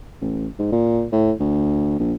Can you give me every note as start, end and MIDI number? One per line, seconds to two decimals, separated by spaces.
0.21 0.47 33
0.59 0.72 44
0.72 1.06 46
1.12 1.32 45
1.40 1.95 38
1.99 2.14 34